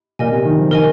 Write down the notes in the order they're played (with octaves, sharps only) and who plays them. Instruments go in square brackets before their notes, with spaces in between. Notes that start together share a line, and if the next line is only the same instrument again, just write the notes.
[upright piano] A#2 [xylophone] A#4 D#5 G#5
[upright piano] C3
D#3
F3
[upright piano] D#3 [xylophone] A#4 D#5 G#5